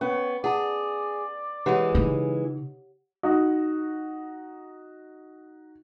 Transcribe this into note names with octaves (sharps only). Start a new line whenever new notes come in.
B3 C#4 C#5
G#4 D5 F#5 A5
E3 G#3 G4 C#5 F#5
C#3 D#4
D#4 F#4